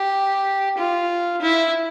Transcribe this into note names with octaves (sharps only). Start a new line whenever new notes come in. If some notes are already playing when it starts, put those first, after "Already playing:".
Already playing: G4
F4
E4